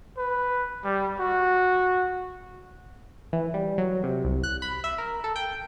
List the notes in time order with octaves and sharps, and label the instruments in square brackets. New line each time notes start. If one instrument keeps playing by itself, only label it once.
[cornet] B4
G3
F#4
[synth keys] E3
G3
F#3
C3
C2
F#6
B5
E5
A#4
A4
G5